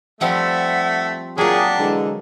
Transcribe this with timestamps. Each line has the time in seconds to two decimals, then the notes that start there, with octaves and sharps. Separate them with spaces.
0.21 F3 G3 A3 C4 E5 F#5
1.38 A#2 F#3 A#3 D4 G4 G#4 F#5
1.78 D3 E3 G#3